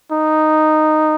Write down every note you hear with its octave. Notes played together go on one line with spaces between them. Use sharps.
D#4